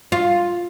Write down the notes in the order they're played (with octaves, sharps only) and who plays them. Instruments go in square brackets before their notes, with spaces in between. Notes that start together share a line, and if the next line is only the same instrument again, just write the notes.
[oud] F4